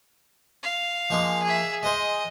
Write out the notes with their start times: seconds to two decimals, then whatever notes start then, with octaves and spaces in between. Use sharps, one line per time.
0.63 F5
1.10 F3 G#3 A#3
1.43 G#4 E5
1.83 G#3 C5 D#5